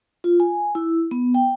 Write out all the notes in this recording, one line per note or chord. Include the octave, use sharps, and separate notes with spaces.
F4
G#5
E4
B3
G5